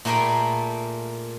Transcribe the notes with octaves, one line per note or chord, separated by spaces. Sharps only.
A#2 A3 G#4 A#4 G5 B5